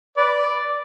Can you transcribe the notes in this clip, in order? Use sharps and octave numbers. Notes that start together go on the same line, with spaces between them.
B4 D5